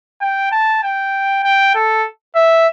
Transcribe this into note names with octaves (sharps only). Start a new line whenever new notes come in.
G5
A5
G5
G5
A4
E5